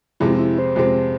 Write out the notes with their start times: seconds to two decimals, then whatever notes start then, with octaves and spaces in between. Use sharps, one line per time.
0.20 F2 C3 G#3 C4 E4
0.39 E4
0.58 C5
0.76 F2 C3 G#3 C4